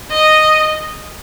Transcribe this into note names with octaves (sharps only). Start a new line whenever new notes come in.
D#5